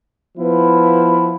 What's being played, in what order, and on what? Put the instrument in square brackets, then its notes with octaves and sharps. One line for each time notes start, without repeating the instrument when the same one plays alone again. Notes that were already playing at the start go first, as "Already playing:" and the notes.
[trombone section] F3 B3 E4 B4